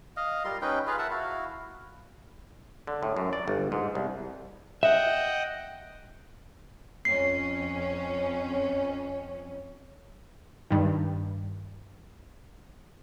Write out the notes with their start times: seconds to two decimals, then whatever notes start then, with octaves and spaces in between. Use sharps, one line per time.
0.17 D#5 F5
0.45 G3 F4 A#4 C6
0.62 C#4 D#4 B4 G5
0.87 F4 G#4 B4 F5
0.98 A#4 E5 F#5 A5
1.11 E4 F#4 F5
2.87 D3
3.03 A2
3.17 F#2
3.33 D5
3.48 G1
3.72 G#2
3.95 C2
4.83 D#5 E5 F#5 G5
7.05 F2 C#4 C7
10.70 G2 D#3